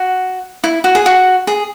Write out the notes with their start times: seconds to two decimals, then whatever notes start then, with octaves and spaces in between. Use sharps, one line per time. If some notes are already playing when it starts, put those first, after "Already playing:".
Already playing: F#4
0.64 E4
0.84 F#4
0.95 G#4
1.06 F#4
1.47 G#4